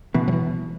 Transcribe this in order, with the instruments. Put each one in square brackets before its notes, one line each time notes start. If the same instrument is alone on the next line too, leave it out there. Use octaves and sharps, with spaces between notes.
[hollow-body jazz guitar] B2 [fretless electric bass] E3
[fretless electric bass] F#3
E3